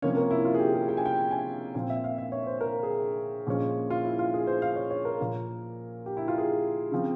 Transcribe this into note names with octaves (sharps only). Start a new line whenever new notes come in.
C3 F3 A#3 C#4 C#5
A#4
E4
F4
G#4
G4
G#4
G5
G#5
G5
G#5
A#2 F3 C4 G5
E5
F5
E5
C#5
C5
A#4
G#4
A#2 F3 G#3 C#4
F4
E4
F4
G#4
C5
F5
C#5
C#5
A#4
A#2 F3 A#3
G4
E4
F4
G#4
C#3 F3 C4